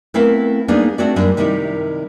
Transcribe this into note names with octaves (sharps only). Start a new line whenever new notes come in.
A3 B3 C4 E4 A#4 F5
G3 A#3 B3 D4 D#4 G#4
A3 C4 D4 F#4 C#5 D5
F#2 G3 A#3 D4
C3 D#3 G3 D#4 E4